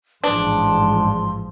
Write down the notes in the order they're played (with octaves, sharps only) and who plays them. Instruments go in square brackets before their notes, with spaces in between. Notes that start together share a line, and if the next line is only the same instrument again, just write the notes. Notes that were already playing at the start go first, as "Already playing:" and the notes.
[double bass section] A1 G#2 F3 [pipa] D4 [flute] C6